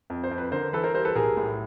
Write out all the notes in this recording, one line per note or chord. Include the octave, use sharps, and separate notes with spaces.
F2
C5
F2
B4
D3 A#4 C5
E3 A4 B4
A#4 C5
G3 A#4 C5
A4 B4
B1 G#4 A#4
A2